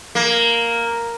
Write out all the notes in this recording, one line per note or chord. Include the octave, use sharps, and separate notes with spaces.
A#3